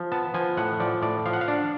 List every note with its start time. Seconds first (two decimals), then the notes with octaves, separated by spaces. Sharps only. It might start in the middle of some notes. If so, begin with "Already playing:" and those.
Already playing: F3
0.12 B3 A5
0.34 F3 G#5
0.57 A2 F#5
0.80 F3 D5
1.02 A2 D5
1.26 F3 F5
1.33 F#5
1.41 F5
1.48 D4 D5